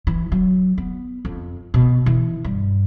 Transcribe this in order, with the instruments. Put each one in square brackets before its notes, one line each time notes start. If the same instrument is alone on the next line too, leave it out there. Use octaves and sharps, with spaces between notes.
[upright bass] E3
F#3
B3
F2
B2
E3
G2